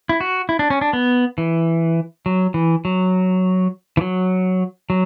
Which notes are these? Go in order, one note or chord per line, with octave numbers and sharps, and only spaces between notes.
E4
F#4
E4
D4
C#4
D4
B3
E3
F#3
E3
F#3
E3
F#3
F#3